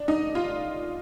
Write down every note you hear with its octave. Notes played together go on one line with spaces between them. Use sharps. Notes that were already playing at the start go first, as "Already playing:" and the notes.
Already playing: D4
D#4
F4